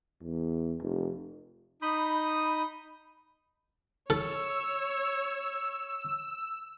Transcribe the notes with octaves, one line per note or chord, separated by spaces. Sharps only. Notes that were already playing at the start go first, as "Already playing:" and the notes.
E2
F1
D#4 B5 D#6 G6
A4 C#5 E6